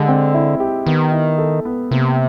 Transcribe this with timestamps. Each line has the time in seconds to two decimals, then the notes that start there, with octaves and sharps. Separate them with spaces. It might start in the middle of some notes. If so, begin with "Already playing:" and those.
Already playing: D3 G#3 G4
0.08 C4
0.34 E4
0.60 G4
0.86 D#3 B3
1.12 E4
1.38 A4
1.65 B3
1.91 C3 A#3